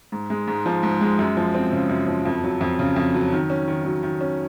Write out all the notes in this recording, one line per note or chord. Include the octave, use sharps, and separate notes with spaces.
G#2
G#3
G#2
F3
G#2
G#3
F#2
F3
C4
C#3
F#2
F3
F2
F#3
F2
C#3
F2
F#3
D#3
C#4
D#3
F#3
D#3
C#4